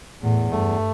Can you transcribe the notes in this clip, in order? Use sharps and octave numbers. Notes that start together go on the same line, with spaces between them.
E2 A2
G2 A3